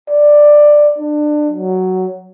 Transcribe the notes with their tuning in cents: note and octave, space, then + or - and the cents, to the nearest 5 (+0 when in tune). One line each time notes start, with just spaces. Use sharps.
D5 +10
D4 +25
F#3 +5